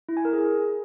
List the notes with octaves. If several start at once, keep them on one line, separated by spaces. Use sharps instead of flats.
E4
G#5
A#4
G#4